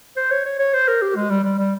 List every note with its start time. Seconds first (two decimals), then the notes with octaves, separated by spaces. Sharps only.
0.17 C5
0.31 C#5
0.45 C#5
0.59 C#5
0.73 C5
0.88 A#4
1.02 G4
1.16 G#3
1.30 G3
1.44 G3
1.58 G3